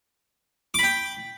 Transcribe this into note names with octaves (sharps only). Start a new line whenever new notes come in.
G5 B5 D6